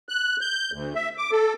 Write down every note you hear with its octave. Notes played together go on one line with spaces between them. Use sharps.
F#6
G6
D2
E5
D6
A4